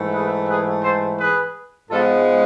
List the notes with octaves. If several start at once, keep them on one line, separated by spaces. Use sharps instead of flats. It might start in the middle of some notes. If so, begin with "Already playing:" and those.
Already playing: G#2 E3 A3
G#4 B4
G#4 B4
A4 C5
G#4 B4
G#2 F3 G#3 B3 F4 A4